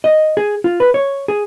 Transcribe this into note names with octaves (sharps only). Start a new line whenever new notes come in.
D#5
G#4
F4
B4
C#5
G#4